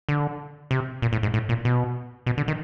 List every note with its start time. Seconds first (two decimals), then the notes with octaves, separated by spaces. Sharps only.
0.09 D3
0.71 C3
1.02 A#2
1.13 A2
1.23 G#2
1.34 A2
1.49 A#2
1.65 B2
2.26 B2
2.38 D3
2.48 D#3